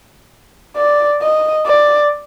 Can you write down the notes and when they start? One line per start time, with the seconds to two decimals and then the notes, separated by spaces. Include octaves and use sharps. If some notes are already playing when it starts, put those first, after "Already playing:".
0.77 D5
1.22 D#5
1.66 D5